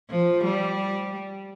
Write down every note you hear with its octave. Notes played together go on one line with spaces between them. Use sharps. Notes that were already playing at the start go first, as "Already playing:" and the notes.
F3
G3